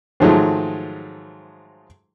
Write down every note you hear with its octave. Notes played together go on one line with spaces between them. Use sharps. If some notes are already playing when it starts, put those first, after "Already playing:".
G#2 D#3 F3 F#3 G#3 A3